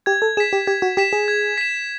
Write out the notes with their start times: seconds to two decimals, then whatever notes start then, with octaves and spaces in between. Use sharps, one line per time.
0.06 G4 G#6
0.22 A4
0.37 G#4 B6 E7
0.53 G4
0.67 G4 G#6
0.82 F#4
0.97 G4 B6 E7
1.13 G#4
1.28 G#6
1.58 B6 E7